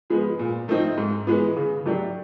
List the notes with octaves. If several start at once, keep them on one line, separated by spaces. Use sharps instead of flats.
F3 G#3 B3
A#2
F3 A3 C4 D#4
G#2
E3 G#3 B3
C#3
F#3 A3 D4 G4